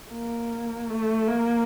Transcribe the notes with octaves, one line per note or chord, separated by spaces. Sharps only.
A#3
A3
A#3